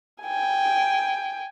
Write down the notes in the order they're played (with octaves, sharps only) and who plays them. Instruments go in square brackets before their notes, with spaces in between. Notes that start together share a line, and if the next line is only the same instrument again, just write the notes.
[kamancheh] G5 G#5